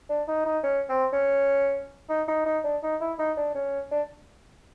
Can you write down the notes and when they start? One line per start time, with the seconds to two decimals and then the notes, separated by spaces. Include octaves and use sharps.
0.10 D4
0.28 D#4
0.46 D#4
0.64 C#4
0.89 C4
1.13 C#4
2.09 D#4
2.28 D#4
2.46 D#4
2.64 D4
2.83 D#4
3.01 E4
3.19 D#4
3.37 D4
3.55 C#4
3.91 D4